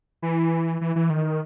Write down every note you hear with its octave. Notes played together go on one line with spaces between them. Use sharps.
E3
E3
E3
D#3